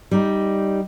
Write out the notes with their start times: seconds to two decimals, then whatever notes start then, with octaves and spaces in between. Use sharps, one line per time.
0.11 G3 D#4